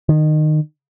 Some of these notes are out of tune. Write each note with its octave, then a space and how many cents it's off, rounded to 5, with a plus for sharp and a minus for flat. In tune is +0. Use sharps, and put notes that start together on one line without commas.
D#3 -20